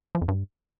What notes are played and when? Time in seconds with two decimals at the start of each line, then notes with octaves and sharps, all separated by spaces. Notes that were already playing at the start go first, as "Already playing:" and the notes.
0.15 F3
0.22 F2
0.28 G2